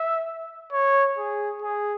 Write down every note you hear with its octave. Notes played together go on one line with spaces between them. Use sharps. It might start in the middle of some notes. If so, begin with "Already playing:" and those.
Already playing: E5
C#5
G#4
G#4